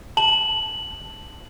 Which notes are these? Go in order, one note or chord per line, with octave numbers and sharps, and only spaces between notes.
A5 F#7